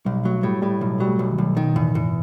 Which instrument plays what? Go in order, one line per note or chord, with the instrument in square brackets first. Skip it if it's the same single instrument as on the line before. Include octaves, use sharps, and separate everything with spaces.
[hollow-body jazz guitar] B1 [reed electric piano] G3
[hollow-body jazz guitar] F#3 [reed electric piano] A3
[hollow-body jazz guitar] A2 [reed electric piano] G3
[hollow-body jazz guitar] A2 [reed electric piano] G3
[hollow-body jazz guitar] B1 [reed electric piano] F#3
[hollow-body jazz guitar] F#3 [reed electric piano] G3
[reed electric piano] A3
[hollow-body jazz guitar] B1
[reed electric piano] D#3
[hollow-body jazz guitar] B1
[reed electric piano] B2 [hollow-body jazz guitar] D#3
[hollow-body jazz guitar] E2 [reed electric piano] A2
[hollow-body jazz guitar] E2 [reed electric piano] G2